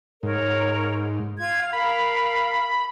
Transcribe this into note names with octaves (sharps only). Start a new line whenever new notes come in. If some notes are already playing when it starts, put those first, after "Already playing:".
G#2 A#4 C#5
F4 G#6
F5
A#4 F5 B5